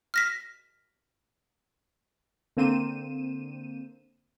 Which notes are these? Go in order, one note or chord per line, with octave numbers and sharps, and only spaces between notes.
F6 A#6 B6
D3 A#3 C4 C5 D#7 E7